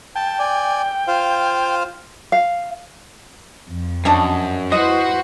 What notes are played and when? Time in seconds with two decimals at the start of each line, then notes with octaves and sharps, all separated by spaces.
0.16 G5 A5
0.39 D5 G#5
1.08 F4 C5 F5
2.32 F5
3.70 F2
4.05 F#2 F3 D4 D#5
4.72 E4 F#4 B4 C5 D#5 F#5